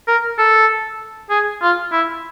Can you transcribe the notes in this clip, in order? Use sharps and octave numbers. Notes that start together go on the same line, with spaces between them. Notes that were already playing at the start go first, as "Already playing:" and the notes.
A#4
A4
G#4
F4
E4